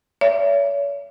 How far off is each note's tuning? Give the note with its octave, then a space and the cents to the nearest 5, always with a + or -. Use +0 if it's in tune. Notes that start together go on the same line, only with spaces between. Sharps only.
C#5 +40 E5 +30